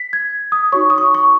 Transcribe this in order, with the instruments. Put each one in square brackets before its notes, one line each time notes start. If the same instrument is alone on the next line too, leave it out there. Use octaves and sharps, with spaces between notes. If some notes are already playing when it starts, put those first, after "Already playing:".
Already playing: [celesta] B6
G#6
D#6
D#4 F#4 C#5 C#6
D#6
C#6
C#6